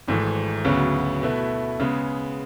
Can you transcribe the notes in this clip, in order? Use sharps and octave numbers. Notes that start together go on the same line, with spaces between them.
G#1 G#2 E3 A3
D2 C#3 F#3 B3
B2 A3 E4 B4
C#3 G#3 B3